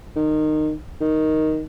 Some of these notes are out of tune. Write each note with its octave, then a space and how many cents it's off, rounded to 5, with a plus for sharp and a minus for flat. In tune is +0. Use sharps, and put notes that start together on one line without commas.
D#3 -20
D#3 +5